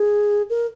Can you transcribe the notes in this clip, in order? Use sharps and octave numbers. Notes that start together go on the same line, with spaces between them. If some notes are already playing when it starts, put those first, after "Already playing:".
Already playing: G#4
A#4